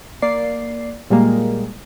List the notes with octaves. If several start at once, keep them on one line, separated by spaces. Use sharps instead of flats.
A#3 D5 C7
A#2 G3 G#3 A#3